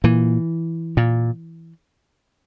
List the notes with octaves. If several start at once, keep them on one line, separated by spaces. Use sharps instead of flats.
A#2 E3
A#2